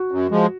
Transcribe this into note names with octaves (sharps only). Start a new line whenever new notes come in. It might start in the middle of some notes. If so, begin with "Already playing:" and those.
Already playing: F#4
F#2
F3 G#3